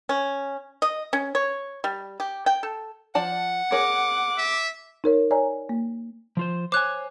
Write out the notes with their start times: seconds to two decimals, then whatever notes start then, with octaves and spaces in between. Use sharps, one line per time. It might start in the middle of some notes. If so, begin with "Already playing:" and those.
0.09 C#4
0.82 D#5
1.13 C#4
1.35 C#5
1.84 G3
2.20 G4
2.46 G5
2.63 A4
3.15 F3 D5 F#5 A5
3.72 G#4 A#4 C#5 D6
4.38 E5
5.04 D#4 A#4 C#5
5.31 C#5 D5 G#5 A#5
5.69 A#3
6.37 F3 F4 C5
6.72 C5 C#5 G#5 D6 F#6